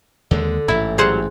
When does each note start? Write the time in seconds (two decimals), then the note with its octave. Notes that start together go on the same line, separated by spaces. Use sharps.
0.31 D#2 D3 G#3
0.68 A1 G#2 E4 E5
0.98 F#3 G3 G#4 C5 F#5